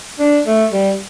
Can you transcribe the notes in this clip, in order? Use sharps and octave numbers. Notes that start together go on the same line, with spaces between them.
D4
A3
G3